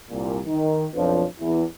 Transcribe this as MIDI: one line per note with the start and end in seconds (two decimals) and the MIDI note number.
0.10 0.39 36
0.10 0.39 46
0.46 0.85 51
0.95 1.24 35
0.95 1.24 41
0.95 1.24 53
0.95 1.24 62
0.95 1.24 71
0.95 1.24 73
1.40 1.64 40
1.40 1.64 52